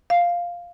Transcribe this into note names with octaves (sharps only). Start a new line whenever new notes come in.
F5